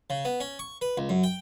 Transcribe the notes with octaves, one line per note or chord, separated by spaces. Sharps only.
C#3
B3
C#4
C#6
B4
C#2
F#2
G5